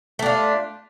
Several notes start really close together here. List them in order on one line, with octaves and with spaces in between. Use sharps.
A3 D4 F4